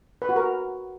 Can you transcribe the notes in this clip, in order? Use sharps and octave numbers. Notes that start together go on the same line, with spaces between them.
B4
F#4
A#4